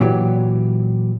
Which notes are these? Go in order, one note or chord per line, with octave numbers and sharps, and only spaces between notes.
A#2 E3 F#3 G4